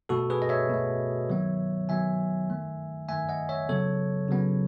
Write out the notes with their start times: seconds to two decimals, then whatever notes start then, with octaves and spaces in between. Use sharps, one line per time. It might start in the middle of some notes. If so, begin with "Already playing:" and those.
0.09 B2 A3 F#4 A4
0.30 G#4 B4
0.42 D#5
0.49 C#5 E5
0.69 B2 A3
1.30 D#3 F#3 B3
1.89 D#3 F#3 B3 E5 G#5
2.50 D#3 A3
3.09 D#3 A3 E5 G#5
3.29 D#5 F#5
3.49 C#5 E5
3.69 C#3 F#3 B3 A4 C#5
4.28 C#3 F#3 B3